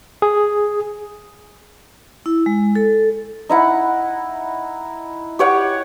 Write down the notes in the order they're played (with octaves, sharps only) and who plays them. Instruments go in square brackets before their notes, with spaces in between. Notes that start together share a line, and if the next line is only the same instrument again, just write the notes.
[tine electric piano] G#4
[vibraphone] E4
G#3
A4
[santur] D#4 E4 F#5
G4 C#5 F#5